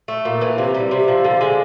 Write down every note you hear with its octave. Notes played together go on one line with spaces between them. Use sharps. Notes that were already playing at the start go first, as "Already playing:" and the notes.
A3
A#2
E3
C3
G3
C3
F3
D3
G#3